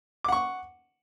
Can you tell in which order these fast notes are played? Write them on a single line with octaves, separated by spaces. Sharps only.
D6 F#5 C#6